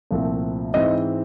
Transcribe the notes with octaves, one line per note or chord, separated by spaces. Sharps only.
C2 A#2 F3 A3 C4
G#2 E3 G#3 C4 D#5